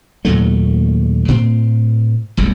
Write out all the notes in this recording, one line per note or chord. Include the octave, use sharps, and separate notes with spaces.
D#2 A#2 F#3 A3
A2 C4
E1 A1 E2 G3